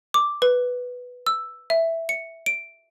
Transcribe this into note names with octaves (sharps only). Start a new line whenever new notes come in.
D6
B4
E6
E5
C#7
D7